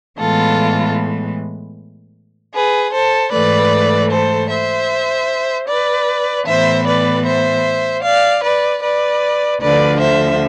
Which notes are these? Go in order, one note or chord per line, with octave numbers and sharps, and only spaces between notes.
A2 E3 G#3 B3 F4 A4
G#4 B4
A4 C5
G#2 E3 A3 B4 D5
A4 C5
C5 E5
B4 D5
A2 E3 B3 C5 E5
B4 D5
C5 E5
D5 F5
B4 D5
B4 D5
D2 D3 F3 B4 D5
C5 E5